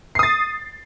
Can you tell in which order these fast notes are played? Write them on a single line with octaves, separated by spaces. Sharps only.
C7 D#6 A6